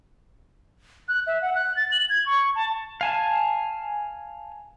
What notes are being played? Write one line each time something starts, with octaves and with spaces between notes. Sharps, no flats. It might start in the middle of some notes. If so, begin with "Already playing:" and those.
F#6
E5
F#5
F#6
A6
F#7
G#6
C#6
A5
F5 G#5 A5